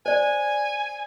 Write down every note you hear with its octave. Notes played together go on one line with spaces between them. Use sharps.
C5 D5 G#5